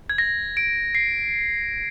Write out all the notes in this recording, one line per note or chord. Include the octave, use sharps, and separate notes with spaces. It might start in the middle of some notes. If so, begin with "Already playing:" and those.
G#6
A#6
D7
C7